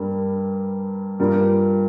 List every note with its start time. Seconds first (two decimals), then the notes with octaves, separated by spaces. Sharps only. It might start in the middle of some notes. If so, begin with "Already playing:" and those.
Already playing: G2 G3 A#3
1.19 G2 G3 A#3 F4 A#4